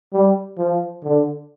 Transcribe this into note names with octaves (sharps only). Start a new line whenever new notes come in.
G3
F3
D3